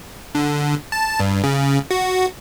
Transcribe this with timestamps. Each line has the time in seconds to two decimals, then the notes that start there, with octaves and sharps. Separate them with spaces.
0.35 D3
0.92 A5
1.19 G2
1.44 C#3
1.91 F#4